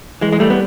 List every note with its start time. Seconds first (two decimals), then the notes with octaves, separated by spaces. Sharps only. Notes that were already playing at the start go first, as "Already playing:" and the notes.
0.21 E3 G#3
0.32 G#3
0.40 G3 A3
0.50 B3